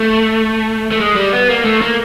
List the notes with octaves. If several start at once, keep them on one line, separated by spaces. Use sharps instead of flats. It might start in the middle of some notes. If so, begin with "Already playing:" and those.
Already playing: A3
A3
G#3
G3
B3
A#3
A3
A#3